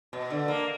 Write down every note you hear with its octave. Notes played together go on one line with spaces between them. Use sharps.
B2
D3
A#3